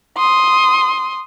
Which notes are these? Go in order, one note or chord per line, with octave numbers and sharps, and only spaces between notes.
C6 D#6